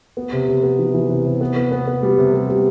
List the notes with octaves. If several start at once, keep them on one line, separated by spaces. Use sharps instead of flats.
B3
C3
C3
B3
E3
E3
C3
C3
B3
B3
B3
B3
G3
C3
B3
G3